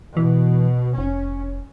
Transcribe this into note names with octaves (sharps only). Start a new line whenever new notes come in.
B2 E3
F1 C#4